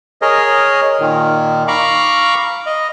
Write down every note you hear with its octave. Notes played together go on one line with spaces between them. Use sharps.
G#4 A#4 C#5 D#5
A#2 D#3
F5 A#5 B5 C#6 D6
D#5